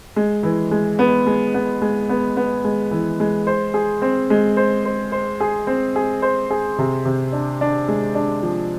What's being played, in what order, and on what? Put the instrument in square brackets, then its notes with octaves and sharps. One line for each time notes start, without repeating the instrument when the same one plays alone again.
[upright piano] G#3
E3
G#3
B3
G#3
B3
G#3
B3
B3
G#3
E3
G#3
C5
G#4
C4
G#3
C5
C5
C5
G#4
C4
G#4
C5
G#4
C3
C3
D4
D4
G#3
D4
F3